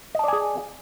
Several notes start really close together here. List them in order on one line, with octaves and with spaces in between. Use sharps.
D#5 A5 D5 G#5 G#4